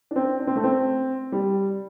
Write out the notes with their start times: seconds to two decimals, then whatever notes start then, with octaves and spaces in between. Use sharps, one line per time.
0.11 D4
0.16 C4
0.40 D4
0.47 C4
0.56 A3
0.64 C4
1.32 G3